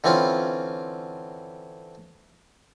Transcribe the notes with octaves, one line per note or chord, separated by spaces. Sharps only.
D3 E3 C4 C#4 F4